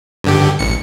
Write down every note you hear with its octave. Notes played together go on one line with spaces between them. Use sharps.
G2 D3 G4
A1 C#7